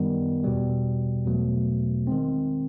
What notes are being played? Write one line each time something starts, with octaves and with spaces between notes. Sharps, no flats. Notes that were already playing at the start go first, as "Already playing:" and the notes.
Already playing: F#2 D#3 G3 B3
E2 B2 G3
E2 B2 F#3 A3
D#3 G#3 C4